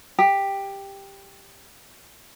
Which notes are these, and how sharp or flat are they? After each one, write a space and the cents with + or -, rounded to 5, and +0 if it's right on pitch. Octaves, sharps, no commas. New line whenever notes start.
G4 +10